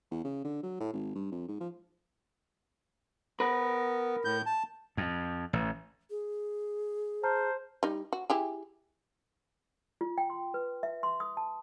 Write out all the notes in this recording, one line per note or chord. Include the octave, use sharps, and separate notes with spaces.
E2
C#3
D3
F#3
A2
G#1
G2
F2
G#2
F3
B3 A#4 B5
A2 G6
A5
F2
A1
G#4
C5 A5 A#5 F6
G3 D#4
F#4
E4 G4 G#4
F4
G5
C6
B4
E5
C6
D#6
A5